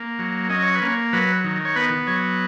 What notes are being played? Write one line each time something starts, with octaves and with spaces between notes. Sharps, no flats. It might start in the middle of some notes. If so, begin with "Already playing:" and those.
Already playing: A#3
F#3
C#4 D#5
C#5
B4
A#3 C#5
F#3 B4
D#3
C#5
B3 B4
F#3 C#5